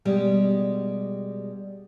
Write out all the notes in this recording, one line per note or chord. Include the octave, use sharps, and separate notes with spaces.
B2 G3 G#3 G4